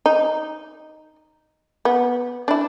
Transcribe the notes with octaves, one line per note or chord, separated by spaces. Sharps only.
D#4
B3
D4 E4